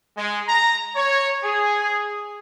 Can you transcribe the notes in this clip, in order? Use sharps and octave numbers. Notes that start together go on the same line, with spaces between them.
G#3
A#5
C#5
G#4